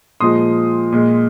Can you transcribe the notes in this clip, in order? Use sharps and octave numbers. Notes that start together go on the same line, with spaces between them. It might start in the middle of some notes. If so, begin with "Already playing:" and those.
A#2 F3 G#3 C6 D#6
A#2 G#3